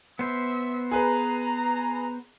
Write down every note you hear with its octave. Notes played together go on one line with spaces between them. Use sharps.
B3 C5 E5
G#4 B4 A#5